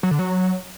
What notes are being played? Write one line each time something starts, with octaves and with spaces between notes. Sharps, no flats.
F#3
D3
F#3